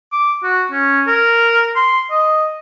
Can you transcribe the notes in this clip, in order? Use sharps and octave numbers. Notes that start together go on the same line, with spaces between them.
D6
F#4
C#4
A#4
C6
D#5